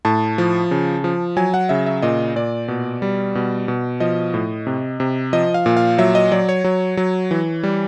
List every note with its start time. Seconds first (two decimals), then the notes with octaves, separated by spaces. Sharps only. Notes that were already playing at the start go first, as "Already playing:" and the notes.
0.05 A2 A5
0.38 F3
0.71 C#3
1.04 F3
1.37 F#3 G#5
1.54 F#5
1.69 C#3 E5
1.86 E5
2.02 A#2 D#5
2.36 A#2 D5
2.68 B2
3.02 G3
3.35 B2
3.68 B2
4.00 F3 D#5
4.34 A2
4.67 C3
5.00 C3
5.33 F3 D#5
5.54 F5
5.66 A#2
5.77 F5
5.98 F#3 E5
6.15 D#5
6.32 F#3 D5
6.49 C#5
6.64 F#3
6.97 F#3
7.31 E3
7.63 G3